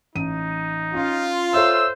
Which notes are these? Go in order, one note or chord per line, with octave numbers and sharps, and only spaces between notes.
A1 D#4 D#7
C#4 F4
A4 C5 C#5 E5 E6